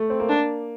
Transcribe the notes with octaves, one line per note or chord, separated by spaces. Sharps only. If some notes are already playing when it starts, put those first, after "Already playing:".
Already playing: A3
C4
A#3
D4